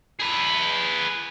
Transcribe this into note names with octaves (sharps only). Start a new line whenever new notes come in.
G#4 B4